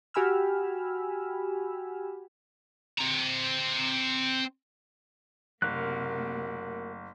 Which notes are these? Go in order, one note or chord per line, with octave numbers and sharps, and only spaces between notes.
F#4 G4 G#5 B5 E6 F6
C4 A#5
F#1 C3 A3 A#3 F#4 A#4 F#6